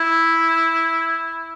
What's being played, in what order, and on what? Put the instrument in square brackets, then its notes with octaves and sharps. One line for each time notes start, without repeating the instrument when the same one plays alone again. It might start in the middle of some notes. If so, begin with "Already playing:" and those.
Already playing: [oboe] E4